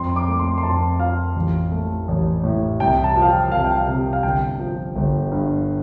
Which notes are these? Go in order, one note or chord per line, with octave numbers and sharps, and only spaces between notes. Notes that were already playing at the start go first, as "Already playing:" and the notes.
Already playing: F2 C6
D6
A3
C6
C6
F2 A5
F3 F5
A1
A3
A1
A2
C2 G5
A5
F3
F5
G5
C2 F5
G5
F5
C3
F5
G1 G5
F3
G1
G2